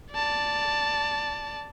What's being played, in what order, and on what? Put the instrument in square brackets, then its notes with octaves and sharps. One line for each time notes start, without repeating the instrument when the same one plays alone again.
[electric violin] D5 A5